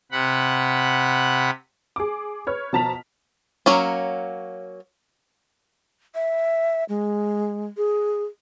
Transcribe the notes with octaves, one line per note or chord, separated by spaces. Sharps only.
C3 F#5 B5
G#4 D6
B4 C#5 F6
B2 F3 A5 A#5 B6 F7
F#3 A#3 C#4
E5
G#3
G#4